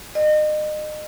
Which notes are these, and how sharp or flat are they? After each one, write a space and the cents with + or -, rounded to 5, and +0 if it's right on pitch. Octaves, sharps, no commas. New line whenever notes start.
D#5 -35